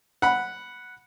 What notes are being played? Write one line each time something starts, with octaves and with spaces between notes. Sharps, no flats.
F#5 B5